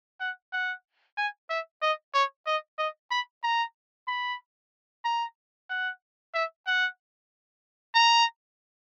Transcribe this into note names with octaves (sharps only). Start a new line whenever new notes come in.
F#5
F#5
G#5
E5
D#5
C#5
D#5
D#5
B5
A#5
B5
A#5
F#5
E5
F#5
A#5